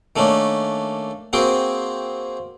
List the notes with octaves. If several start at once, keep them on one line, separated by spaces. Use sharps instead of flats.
D#3 A3 A#3 C#4 D4
A#3 C4 F#4 G#4 G5